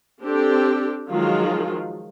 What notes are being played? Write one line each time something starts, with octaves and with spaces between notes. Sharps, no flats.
C4 D4 G4 A4
D#3 F3 F#3 G#3 F4 G#4